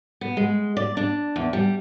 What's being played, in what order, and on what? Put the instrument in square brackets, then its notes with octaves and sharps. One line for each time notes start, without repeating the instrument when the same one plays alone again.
[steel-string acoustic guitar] B3
G#3
D5
D4
E2
G3